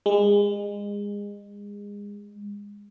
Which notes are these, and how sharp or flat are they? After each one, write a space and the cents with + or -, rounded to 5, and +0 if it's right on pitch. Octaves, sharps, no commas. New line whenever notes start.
G#3 -30